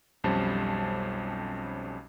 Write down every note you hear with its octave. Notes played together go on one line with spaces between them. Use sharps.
B1 F2 G3 C#4 C5 A5